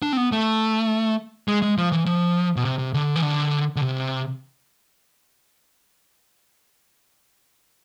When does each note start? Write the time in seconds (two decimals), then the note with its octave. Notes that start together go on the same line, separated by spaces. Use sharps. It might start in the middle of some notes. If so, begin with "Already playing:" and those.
0.03 D4
0.13 C4
0.17 B3
0.32 A3
1.48 G#3
1.62 G#3
1.78 F3
1.92 E3
2.06 F3
2.56 B2
2.65 C3
2.79 C3
2.94 D3
3.16 E3
3.23 D3
3.76 D3
3.81 C3